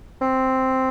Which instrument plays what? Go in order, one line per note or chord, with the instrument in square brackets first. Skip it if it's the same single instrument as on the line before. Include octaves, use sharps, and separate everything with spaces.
[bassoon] C4